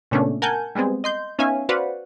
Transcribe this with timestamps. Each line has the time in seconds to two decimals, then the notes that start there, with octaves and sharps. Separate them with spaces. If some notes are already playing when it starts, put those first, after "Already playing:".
0.11 A#2 C#3 A3 B3 C#4 D4
0.42 A#4 F#5 G#5 A5 G6
0.75 G3 G#3 B3 C4 G#4
1.04 D#5 C6 G6
1.39 B3 C#4 D#4 E5 F5 G#5
1.69 F#4 B4 C5 D5 F5 F#5